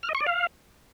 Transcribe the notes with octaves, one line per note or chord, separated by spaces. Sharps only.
F6
D#5
C#6
D5
F5